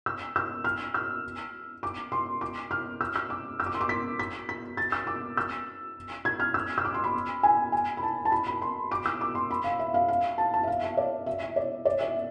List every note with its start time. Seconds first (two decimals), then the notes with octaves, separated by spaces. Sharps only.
0.06 E6
0.36 E6
0.64 F6
0.94 E6
1.83 D6
2.12 C6
2.41 D6
2.71 F6
3.01 E6
3.16 E6
3.30 D6
3.60 E6
3.66 D6
3.74 C6
3.81 D6
3.89 B6
4.19 B6
4.49 B6
4.77 A6
4.92 E6
5.07 D6
5.37 E6
6.25 G#6
6.40 F6
6.54 E6
6.78 E6
6.85 D6
6.94 C6
7.04 B5
7.43 G#5
7.72 G#5
7.97 B5
8.03 A5
8.25 A5
8.32 B5
8.47 B5
8.62 C6
8.91 D6
9.06 E6
9.21 D6
9.35 C6
9.51 B5
9.64 F5
9.79 E5
9.94 F5
10.08 F5
10.38 A5
10.54 A5
10.63 E5
10.67 F5
10.83 E5
10.97 D5
11.26 E5
11.42 E5
11.56 D5
11.85 D5
12.01 E5